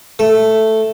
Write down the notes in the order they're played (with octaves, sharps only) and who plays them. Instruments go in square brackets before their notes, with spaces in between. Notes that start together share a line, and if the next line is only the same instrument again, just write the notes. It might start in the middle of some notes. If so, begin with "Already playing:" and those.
[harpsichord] A3